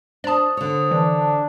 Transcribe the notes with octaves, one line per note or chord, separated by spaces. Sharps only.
D4 C5 D5 A5 D#6
D3 C#5
E3 D4